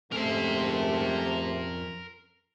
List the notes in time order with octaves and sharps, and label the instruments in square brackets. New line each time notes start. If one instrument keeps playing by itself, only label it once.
[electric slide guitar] F2 C#4 E5 [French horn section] G#2 C3 A3 [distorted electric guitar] A#4 C6